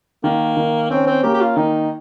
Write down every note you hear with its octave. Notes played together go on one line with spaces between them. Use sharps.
D#3 A#3
D#3
C4 C#4
C4
A#3 G4
G4
F4
D#3 D#4